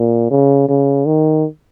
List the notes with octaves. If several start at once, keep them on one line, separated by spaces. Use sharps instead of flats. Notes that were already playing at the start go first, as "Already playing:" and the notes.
Already playing: A#2
C#3
C#3
D#3